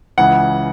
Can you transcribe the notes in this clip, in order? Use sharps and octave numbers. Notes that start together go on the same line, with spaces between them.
C#2 C#3 E3 F#5